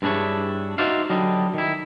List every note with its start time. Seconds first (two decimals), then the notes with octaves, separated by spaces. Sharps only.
0.02 G2 C4 D4 E4 G#4 C#5
0.78 D#4 F#4 C5 D5 E5 F5
1.10 D3 F#3 G3 D#5
1.54 D#3 E4